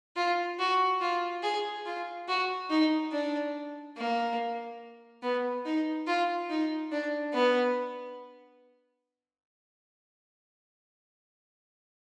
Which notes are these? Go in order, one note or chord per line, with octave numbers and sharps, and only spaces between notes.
F4
F#4
F4
G#4
F4
F#4
D#4
D4
A#3
B3
D#4
F4
D#4
D4
B3